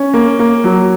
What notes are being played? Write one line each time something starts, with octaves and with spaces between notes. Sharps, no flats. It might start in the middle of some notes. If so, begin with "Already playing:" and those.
Already playing: C#4
A#3
A#3
F#3